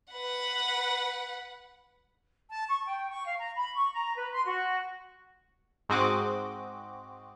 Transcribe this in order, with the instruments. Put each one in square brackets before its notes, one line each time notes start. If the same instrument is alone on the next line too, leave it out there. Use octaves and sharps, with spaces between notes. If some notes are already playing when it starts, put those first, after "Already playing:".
[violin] B4 F#5
[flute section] A5
C#6
G5
C#6
F5
A#5
B5
C#6
A#5
B4
C6
F#4
[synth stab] G#2 G#3 C4 F#4 D#5 D6